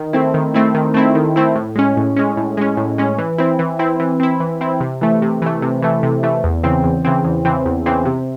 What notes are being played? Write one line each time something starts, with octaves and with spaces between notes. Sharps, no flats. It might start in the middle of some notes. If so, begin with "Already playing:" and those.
Already playing: D#3
A3 C4 E4
D#3
A3 C4 E4
D#3
A3 C4 E4
D#3
A3 C4 E4
A2
G#3 C#4
A2
G#3 C#4
A2
G#3 C#4
A2
G#3 C#4
E3
C4 E4
E3
C4 E4
E3
C4 E4
E3
C4 E4
C3
E3 A3
C3
E3 A3
C3
E3 A3
C3
E3 A3
E2
C#3 E3 C4
E2
C#3 E3 C4
E2
C#3 E3 C4
E2
C#3 E3 C4
C3